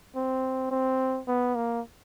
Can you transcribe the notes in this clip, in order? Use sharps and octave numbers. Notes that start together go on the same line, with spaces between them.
C4
C4
B3
A#3